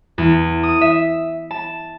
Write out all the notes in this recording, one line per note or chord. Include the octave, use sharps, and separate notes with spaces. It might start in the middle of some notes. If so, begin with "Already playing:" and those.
E2
D#6
E5
A5